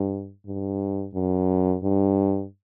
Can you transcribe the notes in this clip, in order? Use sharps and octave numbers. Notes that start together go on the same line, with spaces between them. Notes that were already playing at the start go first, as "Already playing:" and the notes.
Already playing: G2
G2
F#2
G2